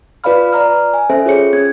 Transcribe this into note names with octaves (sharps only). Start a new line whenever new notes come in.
F4 B4 D5 F5 B5 F6
D5 A#5 F6
G#5
C#4 A4 C5 E5
F4 G#4 C#5 C#7
C#4 G#6